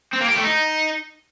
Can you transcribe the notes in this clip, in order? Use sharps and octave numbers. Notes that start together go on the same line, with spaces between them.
C4
A#3
G4
A3
D#4